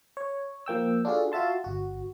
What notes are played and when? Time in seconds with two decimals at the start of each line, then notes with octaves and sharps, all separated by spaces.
0.17 C#5
0.66 F3 A#3 G5 E6
1.05 D4 F4 F#4 G#4 A4
1.32 F4 F#4 E5 A5 C6
1.64 G1 F#4